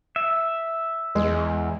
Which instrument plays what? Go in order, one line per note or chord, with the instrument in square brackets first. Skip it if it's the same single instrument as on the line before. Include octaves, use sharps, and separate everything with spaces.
[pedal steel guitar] E5
[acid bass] E2 [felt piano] G#3